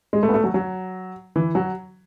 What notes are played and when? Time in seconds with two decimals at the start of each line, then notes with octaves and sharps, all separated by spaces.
0.13 G#3
0.23 A3
0.29 B3
0.34 A3
0.44 F#3
0.54 F#3
1.36 E3
1.55 F#3